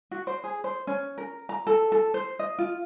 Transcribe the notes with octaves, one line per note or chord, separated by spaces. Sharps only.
F#4
C5
G#4
C5
C#4
A#4
A#5
A4
A4
C5
D#5
F4